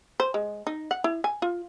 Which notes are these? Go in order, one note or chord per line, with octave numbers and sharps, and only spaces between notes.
C5
G#3
D#4
F#5
E4
G#5
F4